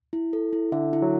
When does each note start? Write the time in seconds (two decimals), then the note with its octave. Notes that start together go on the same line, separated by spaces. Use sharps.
0.13 E4
0.33 A4
0.53 E4
0.72 D3 E5
0.93 E4
1.02 F#3